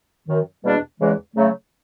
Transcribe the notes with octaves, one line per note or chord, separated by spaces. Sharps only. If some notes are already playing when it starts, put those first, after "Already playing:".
F#2 D#3 F#3
E2 B2 G3 A#3 D4
E2 C#3 E3 G#3
C#3 F#3 A3